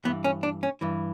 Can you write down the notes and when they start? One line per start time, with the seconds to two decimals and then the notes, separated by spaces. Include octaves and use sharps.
0.05 G2 E3 B3
0.24 C#4
0.43 D4
0.63 C#4
0.81 G2 E3